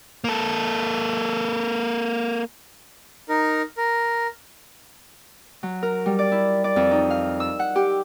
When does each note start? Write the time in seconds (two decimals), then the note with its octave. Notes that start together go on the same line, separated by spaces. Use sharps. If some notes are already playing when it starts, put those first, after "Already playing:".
0.24 A#3 A4
3.29 D#4 A#4
3.77 A#4
5.63 F#3
5.83 A#4
6.06 G3
6.19 D5
6.32 E4
6.64 D5
6.76 F2
6.91 D#4
7.10 F5
7.40 E6
7.59 F#5
7.76 G4